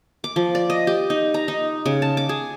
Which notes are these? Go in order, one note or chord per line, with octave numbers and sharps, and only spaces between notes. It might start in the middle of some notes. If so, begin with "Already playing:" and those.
D6
F3
D5
D#5
G4
D#4
A#5
D#4
C#3
A5
D6
G#4